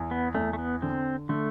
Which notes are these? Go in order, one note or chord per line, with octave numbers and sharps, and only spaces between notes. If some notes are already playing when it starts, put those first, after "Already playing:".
Already playing: E2
B3
E2 A3
A3
B3
D3 C4
D3 A3